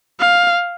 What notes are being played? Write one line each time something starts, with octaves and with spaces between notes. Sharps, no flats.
F5